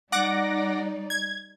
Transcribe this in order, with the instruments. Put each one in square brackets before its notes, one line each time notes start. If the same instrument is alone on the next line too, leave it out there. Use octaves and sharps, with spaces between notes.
[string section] G3 D#4 D5 [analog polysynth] F#5 D6 A#6
[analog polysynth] G#6